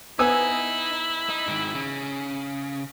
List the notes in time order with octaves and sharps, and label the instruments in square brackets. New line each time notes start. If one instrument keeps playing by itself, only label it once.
[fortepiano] B3 G#5 E6 [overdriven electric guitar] D#4 [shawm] E4
[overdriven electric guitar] D#4
G#2 D#3
C#3